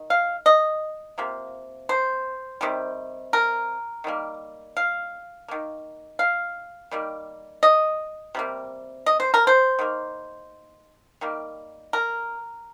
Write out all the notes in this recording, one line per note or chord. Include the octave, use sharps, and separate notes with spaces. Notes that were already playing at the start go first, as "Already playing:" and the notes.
Already playing: D#3
F5
D#5
C3 F3 A#3
C5
C3 D#3 G3
A#4
D#3 G3 A#3
F5
D#3 A#3
F5
D#3 G3 A#3
D#5
C3 G3 A#3
D#5
C5
A#4
C5
D#3 A#3
D#3 G3 A#3
A#4